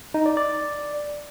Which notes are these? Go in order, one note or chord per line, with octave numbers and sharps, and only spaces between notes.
D#4
D5
D5